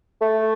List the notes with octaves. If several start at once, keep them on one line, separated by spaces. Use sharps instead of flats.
A3